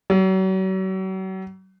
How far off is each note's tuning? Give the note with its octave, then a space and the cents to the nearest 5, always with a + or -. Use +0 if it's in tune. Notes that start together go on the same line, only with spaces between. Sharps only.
F#3 +40